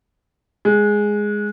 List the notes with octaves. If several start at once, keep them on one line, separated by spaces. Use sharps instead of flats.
G#3